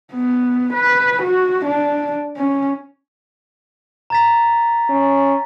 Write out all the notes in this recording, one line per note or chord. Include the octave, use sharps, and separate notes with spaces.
B3
B4
F#4
D4
C#4
A#5 A6 B6
C#4